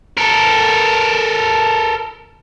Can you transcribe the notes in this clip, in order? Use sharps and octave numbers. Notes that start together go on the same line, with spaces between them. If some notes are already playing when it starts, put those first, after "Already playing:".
A4 A#4